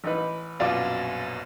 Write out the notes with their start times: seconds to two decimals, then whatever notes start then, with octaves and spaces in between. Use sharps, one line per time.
0.04 A1 D#4 B4
0.60 A#1 F#2 B2 F4 D5 F5